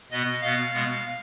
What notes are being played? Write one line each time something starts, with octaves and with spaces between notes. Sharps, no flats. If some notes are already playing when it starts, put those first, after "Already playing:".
B2 B3 D#5
B2 B3 F5
B2 G#3 B3